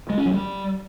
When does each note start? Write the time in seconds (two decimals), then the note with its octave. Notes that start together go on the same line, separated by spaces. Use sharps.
0.10 G#3
0.18 C#4
0.26 F#3
0.34 G3